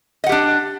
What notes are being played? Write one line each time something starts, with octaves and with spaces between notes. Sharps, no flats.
D4 G4 D#5 F#5